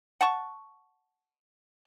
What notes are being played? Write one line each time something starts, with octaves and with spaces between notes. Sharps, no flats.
F#5 A5 C#6